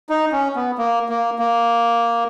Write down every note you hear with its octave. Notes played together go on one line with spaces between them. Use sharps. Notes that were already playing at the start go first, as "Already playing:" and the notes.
D#4
C#4
B3
A#3
A#3
A#3